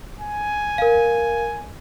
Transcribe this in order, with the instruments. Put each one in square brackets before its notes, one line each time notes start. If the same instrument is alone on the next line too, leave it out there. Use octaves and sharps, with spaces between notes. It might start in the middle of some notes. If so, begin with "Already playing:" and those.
[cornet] G#5
[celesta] A#4 F5